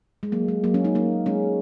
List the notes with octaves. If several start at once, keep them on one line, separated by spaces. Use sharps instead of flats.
G#3
F#3 A#3
G#3
F#3 A#3
G#3 C#4
A#3 D#4
A#3 D#4
G#3 C#4